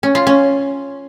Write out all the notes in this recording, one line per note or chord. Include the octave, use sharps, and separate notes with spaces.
C#4
F4
C#4